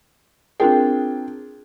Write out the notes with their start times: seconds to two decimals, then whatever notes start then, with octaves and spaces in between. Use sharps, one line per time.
0.60 C4 D4 F4 G#4 A#4 G5